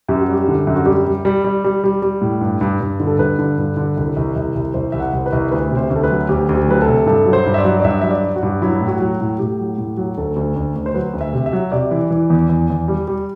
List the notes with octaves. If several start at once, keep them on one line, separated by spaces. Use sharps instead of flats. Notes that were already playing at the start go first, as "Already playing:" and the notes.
F#2 G4
F#4
G3 G4
D3
F#2
F#4
G3 G4
G3
G3
G3
G3
G3
G3
A2
G2
G2
G2
D3
A4
G2 B4
D3
G2
D3
C2
C2
C2
C2
C2 C5
C2 E5
F#5
C2
C5
B4
C2
D2 B4
C3
C5
D2
A4
B4
F#3
D2 G4
D2
G4
F#3 B4
A4
C3
G2 A4
F#3
C5
G2
E5
D5
F#3
D5
G2 E5
F#3 E5
D5
F#3
F#4
G2
F#3 E4
A2
F#4
F#3
A2
A2 G4
F#3
A2
F#3
D2 A4
D2
D2
D2
C5
F#3 B4
D2
E5
C3
E5
F#3
C3 D5
E3
E3
E2
E2
E2
G3
G3